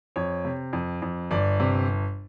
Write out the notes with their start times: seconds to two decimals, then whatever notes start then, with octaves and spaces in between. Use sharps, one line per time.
0.16 F2 C#5
0.45 C3
0.73 F2
1.02 F2
1.31 G1 D5
1.60 C3